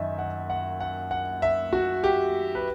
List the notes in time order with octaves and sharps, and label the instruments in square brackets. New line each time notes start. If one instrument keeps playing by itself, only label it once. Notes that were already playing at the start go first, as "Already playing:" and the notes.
Already playing: [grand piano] F#2 D#3 D#5 E5
F#5
F#5
F#5
F#5
E5
F#4
G4
B4